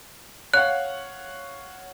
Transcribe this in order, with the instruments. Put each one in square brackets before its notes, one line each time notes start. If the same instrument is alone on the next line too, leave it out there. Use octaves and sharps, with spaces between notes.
[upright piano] C#5 F5 F#5 [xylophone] F#6